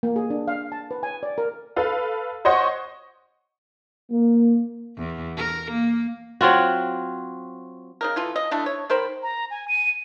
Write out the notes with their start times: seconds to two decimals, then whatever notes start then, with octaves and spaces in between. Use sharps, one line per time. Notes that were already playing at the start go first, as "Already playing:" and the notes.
0.03 A#3
0.16 G#4
0.30 D4
0.48 F5
0.72 A5
0.91 B4
1.03 G#5
1.23 D5
1.38 A#4
1.76 A4 B4 F5
2.45 C5 C#5 D#5 F#5 C6 C#6
4.11 A#3
4.97 E2
5.36 A#4
5.71 A#3
6.41 F#3 C4 F4 F#4
8.01 C#3 D#4 A#4
8.16 E3 F4 A4
8.36 D#5
8.51 A3 D4 E4
8.66 C#5
8.90 D#3 A#4 C5 B5
9.23 A#5
9.51 G#5
9.68 D#7